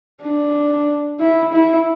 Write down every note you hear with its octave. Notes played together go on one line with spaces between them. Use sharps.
D4
E4
E4